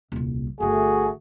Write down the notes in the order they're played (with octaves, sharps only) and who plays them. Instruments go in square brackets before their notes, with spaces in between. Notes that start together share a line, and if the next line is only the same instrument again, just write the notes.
[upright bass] D#1 C2
[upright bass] G1 D3 [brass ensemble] A3 F#4 [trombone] G#4